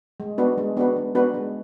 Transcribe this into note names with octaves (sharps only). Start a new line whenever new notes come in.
G#3
B3 D4 F#4 B4
G#3
B3 D4 F#4 B4
G#3
B3 D4 F#4 B4
G#3